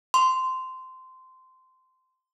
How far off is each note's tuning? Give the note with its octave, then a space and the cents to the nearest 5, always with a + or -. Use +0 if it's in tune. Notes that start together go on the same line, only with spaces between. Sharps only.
C6 -15